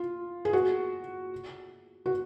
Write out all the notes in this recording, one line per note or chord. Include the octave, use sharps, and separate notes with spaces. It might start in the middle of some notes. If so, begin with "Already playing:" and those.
Already playing: F4
G#4
F#4
F#4